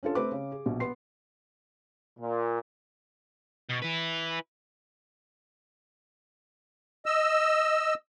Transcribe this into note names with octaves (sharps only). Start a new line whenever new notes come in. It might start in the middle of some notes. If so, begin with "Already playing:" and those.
C#4 D4 F4 A4
A3 C4 B4 D6
C#3
G#4
A#1 B2
B3 C6 C7
A#2
B2
E4 B4
D#5 E6